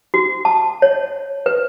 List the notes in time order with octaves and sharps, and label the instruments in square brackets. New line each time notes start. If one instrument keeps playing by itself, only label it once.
[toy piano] F#4
A5
C#5
B4